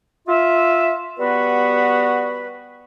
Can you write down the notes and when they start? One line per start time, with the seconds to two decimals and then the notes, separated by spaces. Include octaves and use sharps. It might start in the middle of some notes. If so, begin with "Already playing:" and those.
0.28 F4 E5
1.18 G3 B3 F#4 B4